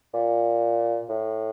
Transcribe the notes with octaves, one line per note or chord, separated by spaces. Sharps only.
A#2
A2